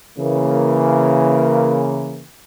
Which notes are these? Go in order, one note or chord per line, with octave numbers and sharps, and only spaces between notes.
C#3 E3 A#3